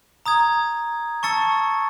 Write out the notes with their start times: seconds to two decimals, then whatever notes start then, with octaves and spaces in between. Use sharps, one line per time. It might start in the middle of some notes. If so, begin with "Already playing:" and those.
0.26 A#5 D#6 G#6
1.23 A5 C#6 E6 A6 C#7